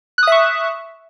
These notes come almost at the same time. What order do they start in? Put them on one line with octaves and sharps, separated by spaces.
F#6 D#6 E5 C#6